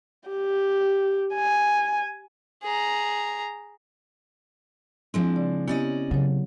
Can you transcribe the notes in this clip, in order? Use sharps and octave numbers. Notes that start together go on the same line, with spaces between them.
G4
G#5
G#4 A#5
F3 G#3 C4 D4 E4
C#3 D5
B3 C#4 E4 G4 D5 D#5
C#3 F#3 C#5